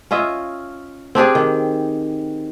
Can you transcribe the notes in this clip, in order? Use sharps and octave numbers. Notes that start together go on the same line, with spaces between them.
C#4 F4 D#5 E5
C4 D4 G4 G#4
D#3